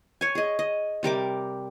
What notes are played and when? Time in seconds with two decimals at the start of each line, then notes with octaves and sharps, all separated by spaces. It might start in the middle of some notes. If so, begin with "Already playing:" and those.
0.21 C#5 G#5
0.35 G#4 D#5
0.59 D#5
1.03 C3 G3 A#4 D6